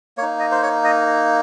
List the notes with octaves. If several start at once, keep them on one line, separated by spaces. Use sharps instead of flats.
A#3 D#4 C#5
D#5
C5
C#5
D#5